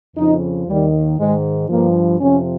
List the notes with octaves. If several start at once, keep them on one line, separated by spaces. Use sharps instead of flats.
F2 C#3 F3 D#4
D#2 D#3 G3
G#2 D#3 G#3
G2 F3 A#3
F2 C3 F3 C#4